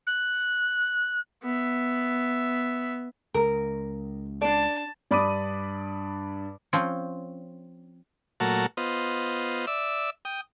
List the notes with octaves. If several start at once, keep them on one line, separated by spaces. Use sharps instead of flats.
F#6
B3 E5
C#2 A#4
D4 D5 A5
G2 D5 B5 D6 D#6 D#7
F3 C4 C#4
A#2 F#3 A3 F#4 A#4 A5
B3 F4 C5 D#5
D5 E5 E6
G5 D#6